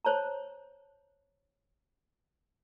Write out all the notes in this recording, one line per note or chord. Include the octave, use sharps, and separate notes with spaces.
C5 C#5 A5 A#5